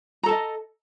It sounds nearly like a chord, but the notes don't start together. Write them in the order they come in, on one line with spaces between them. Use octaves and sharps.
A#5 A4 A5 D#5